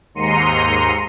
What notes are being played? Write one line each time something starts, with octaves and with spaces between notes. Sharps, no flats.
D#2 G#2 A#5 C6 C#7 D#7